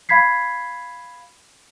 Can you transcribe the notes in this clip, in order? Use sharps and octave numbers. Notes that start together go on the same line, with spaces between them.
F5 B5 G#6 B6 C7